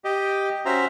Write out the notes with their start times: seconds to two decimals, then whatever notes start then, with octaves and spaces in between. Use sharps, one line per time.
0.05 G4 D#5
0.66 C#4 F#4 C5 E5 A#5